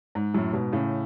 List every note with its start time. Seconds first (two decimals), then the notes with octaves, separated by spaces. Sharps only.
0.15 G#2
0.34 F#2 A2
0.53 G#2 B2
0.73 A2 C#3